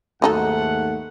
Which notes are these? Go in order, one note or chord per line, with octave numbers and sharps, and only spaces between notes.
D#2 G#2 F#3 A3 D#4 A4 F#5